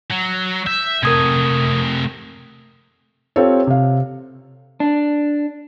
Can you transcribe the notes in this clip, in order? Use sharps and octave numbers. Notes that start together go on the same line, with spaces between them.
F#3
E5 G6
C3 A3 A#4 D#6 G#6
C4 F4 G4 A4 C#5
C3 F5
D4